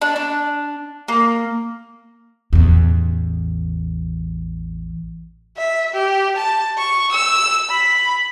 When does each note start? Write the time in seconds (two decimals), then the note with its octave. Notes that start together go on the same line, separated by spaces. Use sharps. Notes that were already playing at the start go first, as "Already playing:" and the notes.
0.02 D4
0.16 D4
1.08 A#3
2.53 A1 E2
5.57 E5
5.93 G4
6.36 A5
6.78 C#6
7.12 E6
7.70 B5